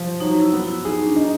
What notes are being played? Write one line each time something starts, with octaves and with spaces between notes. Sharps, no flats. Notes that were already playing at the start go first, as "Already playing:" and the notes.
Already playing: F3
F#3 D#4
E4
B3
E4
D#4 G#4
D4
D#4